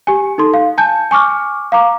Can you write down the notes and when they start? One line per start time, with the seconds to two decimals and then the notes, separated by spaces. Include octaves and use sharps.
0.07 G4 G#5
0.38 D#4 A4 C6
0.54 F5
0.78 G#5 A5 G6
1.11 G#5 C#6 D6 F6
1.72 F5 A#5 D6